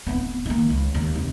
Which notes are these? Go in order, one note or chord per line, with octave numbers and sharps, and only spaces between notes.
D1 B3
D#3 A#3
C#2
D#2
F1